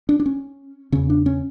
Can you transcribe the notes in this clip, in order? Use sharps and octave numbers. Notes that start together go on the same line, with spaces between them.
D4
D4
C#4
E2 C#3 C#4
D4
C#4